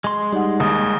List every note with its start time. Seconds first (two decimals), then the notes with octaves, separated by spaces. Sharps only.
0.04 G#3 C6
0.33 G3 D#4 F#5
0.60 D#2 D#6